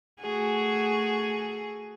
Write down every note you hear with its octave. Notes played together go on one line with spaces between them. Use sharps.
A3 F#4 G#4